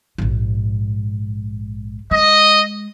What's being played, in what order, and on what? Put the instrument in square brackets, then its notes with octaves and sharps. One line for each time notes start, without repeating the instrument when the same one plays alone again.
[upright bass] A#1 G#2
[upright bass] G#3 [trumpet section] D#5